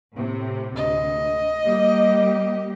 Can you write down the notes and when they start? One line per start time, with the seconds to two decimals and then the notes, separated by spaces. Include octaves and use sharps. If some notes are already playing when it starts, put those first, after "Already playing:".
0.15 A2 C3
0.76 D2 D#5
1.63 G3 A#3 G4